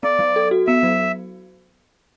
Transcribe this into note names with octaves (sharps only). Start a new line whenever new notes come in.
B3 D5
F#3
A4
F#4
B3 E5
F#3